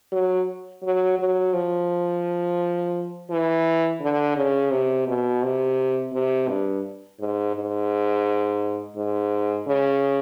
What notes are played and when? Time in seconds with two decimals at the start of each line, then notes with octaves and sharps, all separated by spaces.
0.12 F#3
0.83 F#3
1.19 F#3
1.54 F3
3.31 E3
4.01 D3
4.37 C#3
4.71 C3
5.07 B2
5.43 C3
6.13 C3
6.49 G2
7.19 G#2
7.55 G#2
8.97 G#2
9.67 C#3